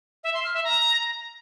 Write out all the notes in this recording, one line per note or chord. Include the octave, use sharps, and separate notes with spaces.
E5
C6
F6
E5
A#5